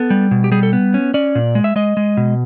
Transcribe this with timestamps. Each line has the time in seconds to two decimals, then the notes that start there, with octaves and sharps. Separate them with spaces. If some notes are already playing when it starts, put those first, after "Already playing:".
Already playing: B3 A4
0.10 G3
0.31 B2
0.44 G4
0.52 G3 G#4
0.63 A4
0.73 B3
0.94 C#4
1.14 C#4 D5
1.35 A#2
1.55 G#3
1.64 E5
1.76 G#3 D#5
1.97 G#3
2.17 B2